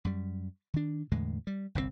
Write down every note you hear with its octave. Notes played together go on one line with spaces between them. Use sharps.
F#2 G3
D#3 D4
E2 A2 D3 G#3
G3
G1 C2 C3 C4